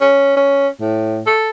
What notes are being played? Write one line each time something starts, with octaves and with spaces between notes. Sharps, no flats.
C#4
C#4
A2
A4